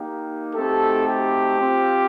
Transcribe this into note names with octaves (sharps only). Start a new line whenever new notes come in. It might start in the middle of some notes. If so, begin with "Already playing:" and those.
Already playing: A#3 D#4 G4
A3 C4 D#4 F#4 G4 A4
G4
C4 F4